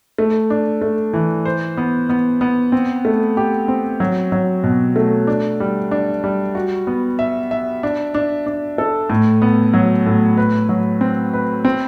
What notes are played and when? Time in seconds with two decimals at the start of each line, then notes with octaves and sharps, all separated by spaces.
0.18 A3
0.50 D4
0.82 A3
1.13 E3
1.45 C5
1.77 B3
2.09 B3
2.41 B3
2.72 C4
3.05 A3
3.37 G4
3.68 C4
4.00 F#3
4.32 F#3
4.64 B2
4.96 A3
5.27 D4
5.60 G3
5.91 D4
6.24 G3
6.55 F#4
6.87 B3
7.19 E5
7.51 E5
7.83 D4
8.15 D4
8.46 D4
8.78 A4
9.10 A2
9.42 B3
9.74 F#3
10.06 A2
10.37 B4
10.69 F#3
11.01 C4
11.33 B4
11.65 C4